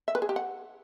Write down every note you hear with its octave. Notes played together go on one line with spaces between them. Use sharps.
E5
B4
G#4
G4
F#5